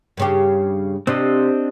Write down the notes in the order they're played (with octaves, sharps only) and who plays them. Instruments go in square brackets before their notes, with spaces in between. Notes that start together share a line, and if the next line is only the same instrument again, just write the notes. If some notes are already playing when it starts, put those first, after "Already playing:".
[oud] G2 C#3 G4
[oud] C3 [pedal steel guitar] C4 D4 D#5